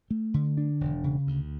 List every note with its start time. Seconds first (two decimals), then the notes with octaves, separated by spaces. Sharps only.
0.10 A3
0.34 D3
0.57 D4
0.81 E1
1.04 C#3
1.27 D2